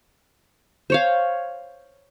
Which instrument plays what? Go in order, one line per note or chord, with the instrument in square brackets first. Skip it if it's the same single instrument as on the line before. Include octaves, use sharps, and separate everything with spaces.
[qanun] C5 C#5 F5